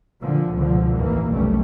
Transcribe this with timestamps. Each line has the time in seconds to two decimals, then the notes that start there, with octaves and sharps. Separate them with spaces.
0.21 A#2 D3 F3
0.55 C#2 B2 D3 F3
0.96 A1 D#2 E3 A#3
1.30 F1 B1 C3 G3 A3 C#4